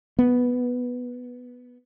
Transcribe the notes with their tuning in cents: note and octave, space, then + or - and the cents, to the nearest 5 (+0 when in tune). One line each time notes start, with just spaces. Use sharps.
B3 +0